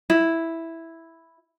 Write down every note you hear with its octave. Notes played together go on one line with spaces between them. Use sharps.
E4